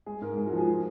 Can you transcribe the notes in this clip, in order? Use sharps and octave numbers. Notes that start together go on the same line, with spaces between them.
G#3 G#4
G#2 A#4
G#2 G#4
F#4
F3
G#4
F3